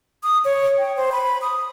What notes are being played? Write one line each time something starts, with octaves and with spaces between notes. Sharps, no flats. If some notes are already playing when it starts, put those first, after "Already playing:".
D#6
C#5
G5
C5
B5
D#6